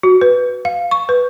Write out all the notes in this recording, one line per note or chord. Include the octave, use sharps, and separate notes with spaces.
F#4
B4
F5
C#6
B4